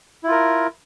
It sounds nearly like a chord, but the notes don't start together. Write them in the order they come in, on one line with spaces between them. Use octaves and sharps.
E4 F4 A#4